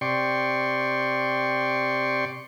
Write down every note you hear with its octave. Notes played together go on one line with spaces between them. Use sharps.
C3 D5 G5 C6 C#6